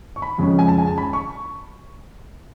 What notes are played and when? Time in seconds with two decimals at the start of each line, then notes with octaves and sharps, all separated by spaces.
0.16 C#6
0.22 B5
0.38 F2 C#3 G#3 C#4
0.59 G#5
0.68 A5
0.78 G#5
0.87 A5
0.98 B5
1.13 C#6